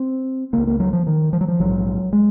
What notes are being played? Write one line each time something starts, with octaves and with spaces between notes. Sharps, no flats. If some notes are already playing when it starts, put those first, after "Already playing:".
Already playing: C4
C#2 C#3 A#3
A#3
F#3
F3
D#3
F3
F#3
F3
A#1 G#2 F#3
G#3